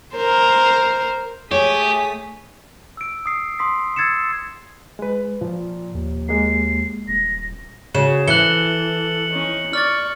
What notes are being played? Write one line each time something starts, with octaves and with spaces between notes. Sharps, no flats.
A#4 C5
A3 G4 G#4 C#5 D#6 B6
E6 D7
D#6 C7
C6 D#6 B6
E6 G#6 A6 C7 C#7 E7
G#3 B4
A#2 F3
D#2
G#3 A#3 C7
D#1 A#6
C#3 F#4 E7
E3 A4 F#6 C#7 F#7 G7
C#4 D#4
D5 C#6 F6 A6